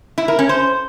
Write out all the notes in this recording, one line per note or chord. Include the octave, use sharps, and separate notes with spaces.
E4
A#4
C#4
C5